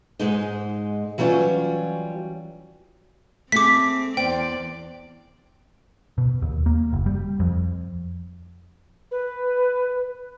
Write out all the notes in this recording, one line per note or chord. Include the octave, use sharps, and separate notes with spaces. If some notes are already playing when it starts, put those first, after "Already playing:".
G#2 G#3 D#4
E3 F#3 G3 C#4 F4
A3 C4 G#4 D6 B6
E2 C5 D5 G5
B2
D#2
A#3
F#1
G3
F2
B4